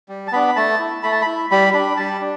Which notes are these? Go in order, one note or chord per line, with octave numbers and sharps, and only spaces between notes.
G3
A5
B3 D4 B5
A3 A5
E4
A3 B5
A5
B5
E4
G3 B5
D4 B5
G3 A5
D4